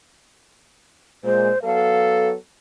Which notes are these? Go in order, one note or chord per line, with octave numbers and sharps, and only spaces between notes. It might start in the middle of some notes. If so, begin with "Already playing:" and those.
A#2 G#3 C5
F#3 B3 A4 F5